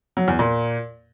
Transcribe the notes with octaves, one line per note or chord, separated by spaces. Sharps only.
F#3
E2
A#2